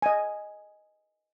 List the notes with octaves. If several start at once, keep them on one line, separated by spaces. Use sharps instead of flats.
D#5 G#5